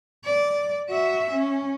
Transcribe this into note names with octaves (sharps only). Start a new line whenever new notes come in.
D5
F#4 E5
C#4